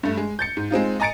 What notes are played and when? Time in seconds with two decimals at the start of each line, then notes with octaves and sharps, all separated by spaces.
0.03 G2 A3
0.17 G#3
0.39 G6 A6 C#7
0.57 G#2
0.71 G#3 C4 D#4 F4
1.00 D#5 G#5 A#5 A6 C#7 D7